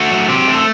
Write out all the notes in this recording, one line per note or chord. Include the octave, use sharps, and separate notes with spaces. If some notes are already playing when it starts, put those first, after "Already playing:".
Already playing: A3 F#4
F#3
C4 G4
A3
A4